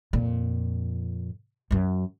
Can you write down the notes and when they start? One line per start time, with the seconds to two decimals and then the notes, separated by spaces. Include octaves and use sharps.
0.13 F2 A#2
1.71 F#2 F#3